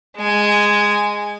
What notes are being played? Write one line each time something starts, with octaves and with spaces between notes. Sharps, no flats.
G#3 G#5